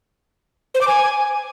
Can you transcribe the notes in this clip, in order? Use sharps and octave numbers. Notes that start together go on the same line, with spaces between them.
C5
D6
G#5